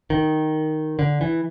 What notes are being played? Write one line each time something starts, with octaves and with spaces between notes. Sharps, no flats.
D#3
D3
E3